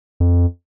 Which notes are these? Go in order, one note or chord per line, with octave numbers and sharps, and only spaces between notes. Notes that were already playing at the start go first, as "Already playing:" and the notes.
F2